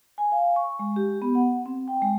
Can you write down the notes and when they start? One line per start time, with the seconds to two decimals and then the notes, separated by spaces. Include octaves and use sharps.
0.18 G#5
0.32 F5
0.56 C#6
0.79 G#3
0.96 G4
1.22 B3
1.35 F#5
1.66 C4
1.88 G5
2.02 G#3